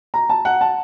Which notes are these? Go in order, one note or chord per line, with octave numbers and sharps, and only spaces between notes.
A#5
A5
F#5
A5